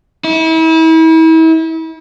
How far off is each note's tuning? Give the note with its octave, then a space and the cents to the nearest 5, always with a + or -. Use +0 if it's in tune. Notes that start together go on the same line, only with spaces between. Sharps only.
E4 -35